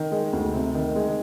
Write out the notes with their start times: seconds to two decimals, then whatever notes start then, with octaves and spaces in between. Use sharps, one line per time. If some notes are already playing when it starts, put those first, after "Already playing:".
Already playing: D#3
0.12 G#3
0.33 D2
0.54 C3
0.74 D#3
0.96 G#3